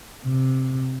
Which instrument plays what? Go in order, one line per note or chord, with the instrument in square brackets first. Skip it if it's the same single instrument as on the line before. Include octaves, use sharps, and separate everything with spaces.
[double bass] C3